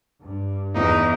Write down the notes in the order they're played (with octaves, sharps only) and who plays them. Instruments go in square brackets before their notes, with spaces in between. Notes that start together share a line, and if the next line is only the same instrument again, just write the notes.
[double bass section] G2
[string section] E2 [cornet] D#4